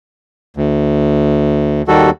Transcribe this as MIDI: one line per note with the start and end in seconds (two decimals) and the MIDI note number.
0.57 1.82 38
1.88 2.10 39
1.88 2.10 51
1.88 2.10 55
1.88 2.10 66
1.88 2.10 69